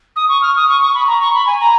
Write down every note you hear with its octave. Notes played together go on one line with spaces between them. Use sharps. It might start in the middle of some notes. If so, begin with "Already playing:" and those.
D#6
C#6
F6
D#6
C#6
C#6
B5
A#5
C#6
B5
G#5
A#5